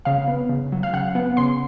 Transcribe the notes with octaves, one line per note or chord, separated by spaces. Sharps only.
C#3 F5
B3
C#3
F#3
F5
C#3 F#5
B3 F#5
C#3 C6